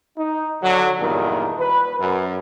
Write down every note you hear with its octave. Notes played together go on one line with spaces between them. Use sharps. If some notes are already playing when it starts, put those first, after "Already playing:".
D#4
D3 F#3
E2 G2 A#2 D#3
B4
F#2